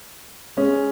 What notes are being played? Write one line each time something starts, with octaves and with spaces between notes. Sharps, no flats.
G#3 C#4